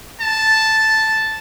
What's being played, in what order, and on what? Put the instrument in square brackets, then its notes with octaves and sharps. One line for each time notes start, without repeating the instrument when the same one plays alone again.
[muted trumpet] A5